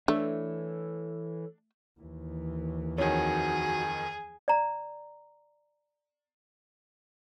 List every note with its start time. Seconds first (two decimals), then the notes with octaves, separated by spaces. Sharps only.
0.08 E3 A3 D4 A4 C#5
2.00 D#2 E3
2.98 F2 D#3 F#4 G#4 C#5
4.48 D5 A#5